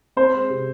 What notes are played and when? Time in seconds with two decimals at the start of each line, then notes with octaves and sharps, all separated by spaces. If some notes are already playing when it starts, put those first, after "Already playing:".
0.17 C4 C5
0.34 G#3
0.50 C3